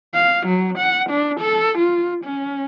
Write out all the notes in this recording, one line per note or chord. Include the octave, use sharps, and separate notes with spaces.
F5
F#3
F#5
D4
A4
F4
C#4